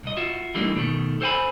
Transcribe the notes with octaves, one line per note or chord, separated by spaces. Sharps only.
C2 D#5
F4 F#4 E5
E3 G3 A3 A#3 D4 D#4
B2 D#3 A3
A4 C5 C#5 G5 G#5 B5